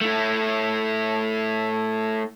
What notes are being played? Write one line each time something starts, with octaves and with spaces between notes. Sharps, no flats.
A3 E4